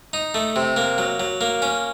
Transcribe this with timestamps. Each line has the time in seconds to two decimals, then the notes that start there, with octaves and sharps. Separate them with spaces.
0.13 D#4
0.34 A3
0.56 C3
0.76 A#3
0.98 F#3
1.20 F#3
1.41 A#3
1.62 C#4